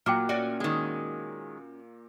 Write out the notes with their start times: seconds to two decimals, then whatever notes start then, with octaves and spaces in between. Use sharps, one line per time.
0.06 A#2 F#3 A#3 G5 D6 F6 C#7
0.29 C#4 F#4 D5
0.60 D#3 G#3